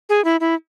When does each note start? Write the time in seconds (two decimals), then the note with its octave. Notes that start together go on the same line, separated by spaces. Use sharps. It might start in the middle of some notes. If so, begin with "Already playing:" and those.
0.09 G#4
0.25 E4
0.40 E4